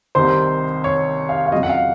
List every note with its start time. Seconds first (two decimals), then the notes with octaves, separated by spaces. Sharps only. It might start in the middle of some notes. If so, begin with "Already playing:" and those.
0.15 C2 C3 D#3 C5 C6
0.84 C#5 C#6
1.29 F5
1.46 F5
1.52 F2 C#3 F#3 D#5
1.63 F#5
1.69 F5